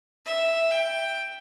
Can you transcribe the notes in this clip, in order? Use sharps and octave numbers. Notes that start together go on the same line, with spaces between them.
E5
G5